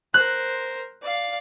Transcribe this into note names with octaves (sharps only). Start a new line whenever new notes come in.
A#4 C5 F#6
D5 F5